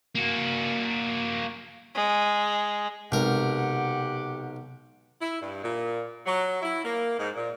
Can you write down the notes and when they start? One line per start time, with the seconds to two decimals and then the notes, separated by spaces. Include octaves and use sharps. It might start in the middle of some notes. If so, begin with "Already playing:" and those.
0.15 A#3 F#4
1.95 G#3
3.12 B1 C3 G#3 C4 G4 A#4 F#5
5.21 E4
5.40 G2
5.63 A#2
6.25 F#3
6.61 E4
6.83 A#3
7.18 G#2
7.35 A#2